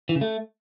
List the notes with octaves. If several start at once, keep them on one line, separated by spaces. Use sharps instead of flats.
E3
C#3
A3